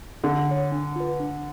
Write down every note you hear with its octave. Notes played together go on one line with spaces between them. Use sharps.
D3 G#4
C#5 F#5
D4
F4 B4
D4